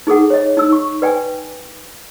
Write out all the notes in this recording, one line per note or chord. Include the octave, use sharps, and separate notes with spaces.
D#4 G#4 A4 F#5
C#5 D#5
D#4 E6
C#6
B4 D5 G5 G#5